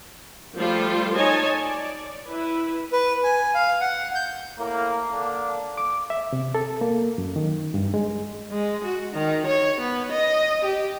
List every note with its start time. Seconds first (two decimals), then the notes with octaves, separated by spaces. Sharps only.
0.57 F3 G3 A3 F4 A4 C5
1.15 D#4 C#5 D#5 G#5 A5
1.61 D5
2.26 E4 B4
2.93 B4
3.24 G#5
3.54 F5
3.81 F#5
4.15 G6
4.57 A2 A#3
5.11 D3 A#3 D4
5.78 D6
6.10 E5
6.33 C3
6.55 A4
6.81 A#3
7.18 F#2
7.36 D#3
7.74 G2
7.94 G#3
8.51 G#3
8.84 F#4
9.14 D#3
9.46 C#5
9.80 B3
10.11 D#5
10.64 G4